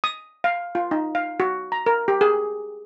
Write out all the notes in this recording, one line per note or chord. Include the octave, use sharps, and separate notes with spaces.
D#6
F5
F4
D#4
F5
F#4
A#5
A#4
G4
G#4